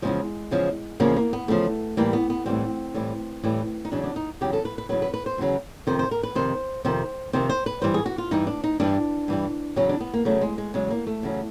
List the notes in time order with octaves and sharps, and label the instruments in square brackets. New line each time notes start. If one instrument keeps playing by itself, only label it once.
[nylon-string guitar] E2 C#3 F3 G#3
E2 C#3 F3
E2 C#3 F3 A#3
A#3
B3
E2 C#3 F3 A3
A2 E3 G3 A#3
B3
B3
A2 E3 G3 C4
A2 E3 G3
A2 E3 G3
D#4
E2 C#3 F#3 D4
D4
D#4
E2 C#3 F#3 G4
A4
B4
B4
E2 C#3 F#3 B4
B4
B4
C5
E2 C#3 F#3
F2 C3 D#3 C5
C5
A#4
B4
F2 C3 D#3 C5
F2 C3 D#3 C5
F2 C3 D#3 C5
C5
B4
G2 E3 G3 C5
G#4
F#4
F4
G2 E3 G3 D#4
D4
D#4
G2 E3 G3 D4
G2 E3 G3
E2 C#3 F#3 C#4
D4
B3
A#3
E2 C#3 F#3 A3
G#3
G#3
E2 C#3 F#3 G#3
A#3
A3
E2 C#3 F#3